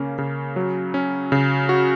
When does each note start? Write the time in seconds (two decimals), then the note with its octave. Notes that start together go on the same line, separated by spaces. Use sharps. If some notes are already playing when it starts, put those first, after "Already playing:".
Already playing: C#3 A#3 C#4
0.18 C#3
0.56 F#3
0.94 C#4
1.32 C#3
1.69 F#4